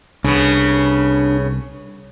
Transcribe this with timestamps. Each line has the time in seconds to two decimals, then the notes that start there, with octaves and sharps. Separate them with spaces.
0.24 C2 C#3 B3 D4